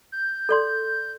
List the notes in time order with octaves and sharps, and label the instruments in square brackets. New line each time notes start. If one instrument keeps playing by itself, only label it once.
[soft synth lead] G6
[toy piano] A4 D5 C6